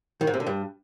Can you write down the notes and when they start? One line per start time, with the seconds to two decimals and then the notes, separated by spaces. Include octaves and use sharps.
0.21 D#3
0.27 G#2
0.34 C3
0.40 D3
0.47 G2